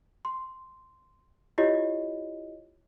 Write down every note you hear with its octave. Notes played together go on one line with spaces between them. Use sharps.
C6
E4 F4 G4 C#5 D#5